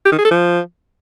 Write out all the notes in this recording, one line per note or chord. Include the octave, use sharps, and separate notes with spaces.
G4
D#3
G#4
A4
F3